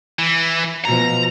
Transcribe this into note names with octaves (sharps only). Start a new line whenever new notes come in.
E3
B2 F3 A#5